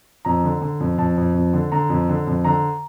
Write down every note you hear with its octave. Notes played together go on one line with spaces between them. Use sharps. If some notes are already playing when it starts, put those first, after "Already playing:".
F2 A#5
D3
D3
F2
F2 A5
F2
F2
D3
D3 A#5
F2
D3
F2
D3 A#5